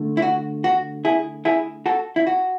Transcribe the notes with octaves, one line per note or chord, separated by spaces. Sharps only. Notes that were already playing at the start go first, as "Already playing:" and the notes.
Already playing: D3 A3
E4
F#4
F#4
E4 G#4
E4 G#4
F#4 A4
E4
F#4